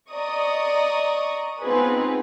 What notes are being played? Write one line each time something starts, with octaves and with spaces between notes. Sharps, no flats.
D5 D#5 A#5 C#6 D#6
B3 C4 D#4 F4 G#4 B4